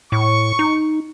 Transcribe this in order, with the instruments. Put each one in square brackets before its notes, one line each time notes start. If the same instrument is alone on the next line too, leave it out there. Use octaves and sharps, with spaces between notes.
[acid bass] A2 [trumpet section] C#6
[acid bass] D#4